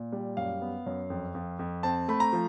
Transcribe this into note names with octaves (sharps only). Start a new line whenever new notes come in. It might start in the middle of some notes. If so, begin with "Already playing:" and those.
Already playing: A#2
G3
F#2 F5
B3
F#2
F2
F2
F2
C4 A5
A3 B5
A#5
F3